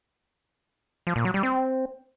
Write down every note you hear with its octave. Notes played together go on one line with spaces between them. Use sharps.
F3
A#2
F#3
G3
C4